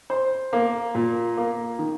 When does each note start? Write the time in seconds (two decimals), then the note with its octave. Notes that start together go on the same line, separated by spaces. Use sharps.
0.10 C5
0.53 A#3
0.95 A#2
1.37 A#3
1.79 D#3